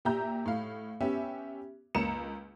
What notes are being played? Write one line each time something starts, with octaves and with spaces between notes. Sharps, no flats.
A#2 G4 E5 A#5 G6
A2 F5
B3 C#4 G4 E5
C#2 A#3 A#5 C#7 E7